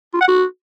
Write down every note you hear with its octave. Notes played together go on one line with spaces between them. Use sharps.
F4
F#5
F#4